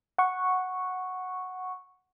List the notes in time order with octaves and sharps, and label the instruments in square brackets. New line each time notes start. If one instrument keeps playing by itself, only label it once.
[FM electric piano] F#5 C#6